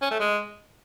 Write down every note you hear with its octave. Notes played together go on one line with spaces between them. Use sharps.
C#4
A3
G#3